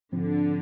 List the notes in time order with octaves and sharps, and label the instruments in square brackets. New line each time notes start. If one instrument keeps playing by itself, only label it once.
[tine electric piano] G#2 F3 C4 [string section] D3